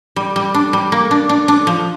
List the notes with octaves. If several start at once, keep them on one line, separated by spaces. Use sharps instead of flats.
G3
G3
D4
G3
A#3
D4
D4
D4
F3